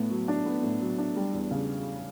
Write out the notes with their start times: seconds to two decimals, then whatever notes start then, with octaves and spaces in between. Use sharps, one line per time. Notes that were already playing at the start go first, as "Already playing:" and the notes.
Already playing: A2 B3
0.11 F#3
0.28 D4
0.46 B3
0.63 A2
0.81 F#3
0.98 D4
1.16 G3
1.34 E2
1.51 C#3